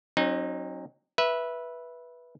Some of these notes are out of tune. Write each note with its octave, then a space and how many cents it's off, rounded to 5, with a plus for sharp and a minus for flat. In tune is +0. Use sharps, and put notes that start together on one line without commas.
F#3 +0 C4 +45 D#4 -20
B4 -15 E5 +0